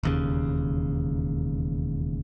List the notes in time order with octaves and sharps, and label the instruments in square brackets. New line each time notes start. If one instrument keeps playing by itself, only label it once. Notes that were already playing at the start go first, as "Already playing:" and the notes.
[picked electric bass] E1 D#2 C#3